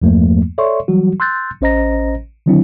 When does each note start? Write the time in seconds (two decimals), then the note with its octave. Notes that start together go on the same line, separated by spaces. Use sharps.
0.02 E2 G2 F3 A3 A#3
0.58 A4 C#5 D5 E5 C6 C#6
0.88 E3 F#3 G3 F#4
1.20 C6 E6 F#6 G6 A6
1.61 A1 C#4 C5 D#5 A#5 A#6
2.46 D3 D#3 F#3 C4 D4 E4